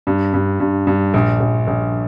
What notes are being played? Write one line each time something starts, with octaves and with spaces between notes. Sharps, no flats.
G2
G2
G2
G2
A#1
A#1
A#1